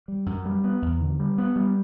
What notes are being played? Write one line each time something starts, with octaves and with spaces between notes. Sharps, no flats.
G3
F#2
G3
B3
E2
D3
G3
B3
G3